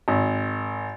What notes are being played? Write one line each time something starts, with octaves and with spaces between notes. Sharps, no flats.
G#1